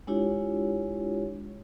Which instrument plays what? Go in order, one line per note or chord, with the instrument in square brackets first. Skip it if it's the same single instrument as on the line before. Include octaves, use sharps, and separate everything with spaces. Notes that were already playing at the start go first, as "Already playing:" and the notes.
[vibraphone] G#3 D4 E4 F4 G4 C#5